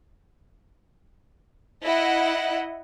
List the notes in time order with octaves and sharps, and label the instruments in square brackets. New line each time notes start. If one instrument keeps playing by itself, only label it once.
[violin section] E4 D#5 F#5